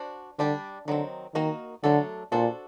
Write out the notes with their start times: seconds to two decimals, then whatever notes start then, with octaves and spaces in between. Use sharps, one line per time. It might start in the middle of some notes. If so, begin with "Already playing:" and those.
Already playing: D4 F#4 C5
0.39 D3 G3 D4 G4
0.87 D3 D#3 F#3 C4
1.35 D#3 A#3 D#4 F#4 A#4
1.84 D3 F#3 A3 D4 A4
2.32 A#2 D4 F#4 A4 C5